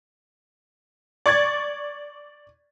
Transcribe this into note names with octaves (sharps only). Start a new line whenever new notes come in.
D5 C#6 G#6 A6